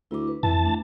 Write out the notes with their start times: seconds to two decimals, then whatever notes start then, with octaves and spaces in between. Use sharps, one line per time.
0.11 D2 E4 D6
0.28 B4
0.43 F2 E3 A5
0.63 A3 D4